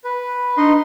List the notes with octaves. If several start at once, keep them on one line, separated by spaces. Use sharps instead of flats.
B4
D4 D#4 D#5 C6